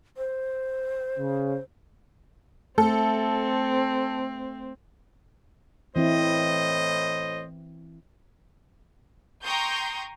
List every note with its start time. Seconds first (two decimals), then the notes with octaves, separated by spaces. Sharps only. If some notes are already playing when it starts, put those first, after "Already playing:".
0.17 C5
1.17 C#3
2.78 A3 C4 A4
5.96 A2 E3 C4 E4 C5 D#5
9.44 G5 A#5 C6 C#6 D#6 G6